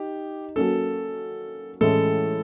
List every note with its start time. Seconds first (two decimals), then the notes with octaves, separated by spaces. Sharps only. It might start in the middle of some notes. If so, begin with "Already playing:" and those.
Already playing: D#4 G4
0.56 F#3 A#3 C#4 A4
1.81 A2 E3 G#3 C#4 E4 A4